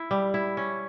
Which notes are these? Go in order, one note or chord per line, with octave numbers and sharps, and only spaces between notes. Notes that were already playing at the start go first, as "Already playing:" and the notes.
Already playing: E4
G3
E4
C#4